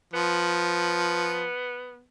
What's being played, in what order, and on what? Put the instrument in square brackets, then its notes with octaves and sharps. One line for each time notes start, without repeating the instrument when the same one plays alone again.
[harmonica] F3 [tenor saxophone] B3